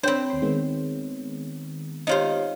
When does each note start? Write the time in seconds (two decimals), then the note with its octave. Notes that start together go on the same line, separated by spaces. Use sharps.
0.03 C4 D4 C5 C#5 G5 B5 G6
0.30 D#2 C6
0.42 D#3 G#3 B3
2.07 D#4 F4 G4 C5 C#5 D#5